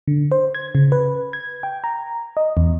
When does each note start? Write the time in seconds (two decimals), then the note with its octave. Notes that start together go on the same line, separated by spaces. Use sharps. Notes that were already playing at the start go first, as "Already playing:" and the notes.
0.08 D3
0.31 C5
0.55 G#6
0.75 C#3
0.92 B4
1.33 G#6
1.63 G5
1.84 A#5
2.37 D#5
2.57 E2